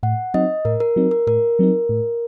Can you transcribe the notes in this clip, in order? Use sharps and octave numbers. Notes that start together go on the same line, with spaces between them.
A2 F#5
F#3 C4 D#4 D#5
A2 A#4
A#4
F#3 C4 D#4
A#4
A2 A#4
F#3 C4 D#4
A2